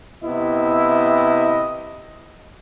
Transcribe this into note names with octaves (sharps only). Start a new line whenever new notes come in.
C3 B3 E4 D#5